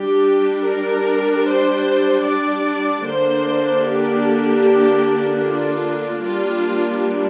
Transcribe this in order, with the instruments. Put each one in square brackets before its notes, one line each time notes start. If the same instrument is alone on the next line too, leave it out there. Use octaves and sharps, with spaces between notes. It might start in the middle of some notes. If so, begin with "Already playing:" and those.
Already playing: [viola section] G3 D4 G4
A#4
C5
D5
D3 A#3 D4 C5
G4
F4
G3 A#3 D4 F4